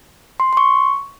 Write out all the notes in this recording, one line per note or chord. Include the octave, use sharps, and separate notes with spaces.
C6
C6
C#6